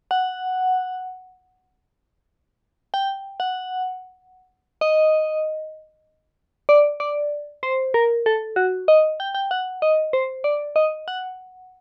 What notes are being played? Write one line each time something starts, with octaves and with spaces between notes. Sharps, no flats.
F#5
G5
F#5
D#5
D5
D5
C5
A#4
A4
F#4
D#5
G5
G5
F#5
D#5
C5
D5
D#5
F#5